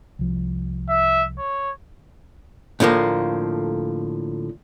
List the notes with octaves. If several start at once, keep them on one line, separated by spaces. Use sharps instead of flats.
C2 F3
E5
C#5
A2 D3 F3 A#3